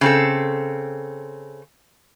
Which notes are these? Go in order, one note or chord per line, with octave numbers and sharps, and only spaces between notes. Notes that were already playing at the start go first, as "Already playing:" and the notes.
C#3 C4 A4